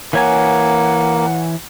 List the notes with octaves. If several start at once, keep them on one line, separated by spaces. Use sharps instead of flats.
E3 A#3 C#5 F#5 G#5